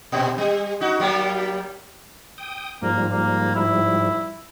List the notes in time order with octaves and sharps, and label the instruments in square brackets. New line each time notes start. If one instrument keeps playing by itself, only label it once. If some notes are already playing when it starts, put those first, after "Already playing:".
[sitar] A#2 C4
G3
D#4 F#4
F#3 G3 A#3
[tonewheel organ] G5 D#6
[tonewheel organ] G#2 F3 G3 [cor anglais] A#3
[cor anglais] A#3
E4